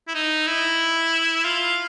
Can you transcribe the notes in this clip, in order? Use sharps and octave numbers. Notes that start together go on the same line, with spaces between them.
E4
D#4
E4
F4